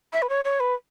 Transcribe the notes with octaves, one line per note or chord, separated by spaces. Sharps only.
E5
B4
C#5
C#5
B4